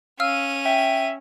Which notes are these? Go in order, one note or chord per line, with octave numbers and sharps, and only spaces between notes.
C#4 F5 E6 F6 D#7
E5 G5